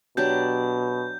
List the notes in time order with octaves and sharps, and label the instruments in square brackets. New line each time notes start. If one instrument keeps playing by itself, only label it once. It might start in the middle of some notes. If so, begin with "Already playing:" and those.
[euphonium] B2 [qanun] F#3 D4 G4 [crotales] G6